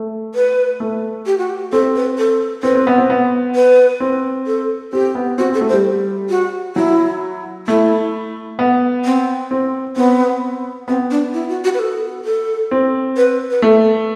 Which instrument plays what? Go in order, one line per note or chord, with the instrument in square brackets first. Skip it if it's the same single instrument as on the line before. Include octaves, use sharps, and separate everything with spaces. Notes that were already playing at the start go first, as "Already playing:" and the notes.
Already playing: [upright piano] A3
[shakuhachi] B4
[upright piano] A3
[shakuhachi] G4
F#4
G4
[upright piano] C4 [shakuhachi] A4
[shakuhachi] B4
A4
[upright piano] C4 [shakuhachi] B4
[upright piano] C4
B3
C4
B3
[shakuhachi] B4
[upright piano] C4
[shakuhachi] A4
[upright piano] C4 [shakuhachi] G4
[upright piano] B3
[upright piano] C4 [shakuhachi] F#4
[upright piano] C4
[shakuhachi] A4
[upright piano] A3
[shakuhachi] C5
[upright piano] G3
[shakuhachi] F#4
[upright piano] F#3 [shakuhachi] E4
[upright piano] A3 [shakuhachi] E4
[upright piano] B3
[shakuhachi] C4
[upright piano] C4
[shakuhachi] B3 [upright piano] C4
[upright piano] B3 [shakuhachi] C4
[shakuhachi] D4
E4
F#4
F#4
B4
A4
A4
[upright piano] C4
[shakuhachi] B4
B4
[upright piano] A3 [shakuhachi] A4